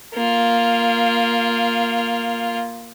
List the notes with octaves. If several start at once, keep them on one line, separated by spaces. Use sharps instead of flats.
A#3 F4